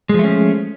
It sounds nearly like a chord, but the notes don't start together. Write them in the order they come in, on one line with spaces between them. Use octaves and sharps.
G#3 F3 A3 C#4